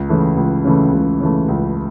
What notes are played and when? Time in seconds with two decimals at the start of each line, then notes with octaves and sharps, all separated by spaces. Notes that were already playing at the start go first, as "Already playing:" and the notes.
Already playing: C#2
0.09 C#3 E3 A3
0.37 C#2
0.65 C#3 E3 A3
0.93 C#2
1.20 C#3 E3 A3
1.48 C#2